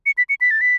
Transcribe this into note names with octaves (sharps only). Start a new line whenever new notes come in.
C#7
B6
C#7
B6
A6
B6